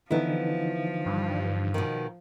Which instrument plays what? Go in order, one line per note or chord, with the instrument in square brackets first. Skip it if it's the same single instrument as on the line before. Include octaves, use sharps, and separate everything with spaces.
[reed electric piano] D3 E3 D#4 [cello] F3 [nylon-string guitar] B3 E4
[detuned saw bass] G2
[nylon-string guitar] B2 D#3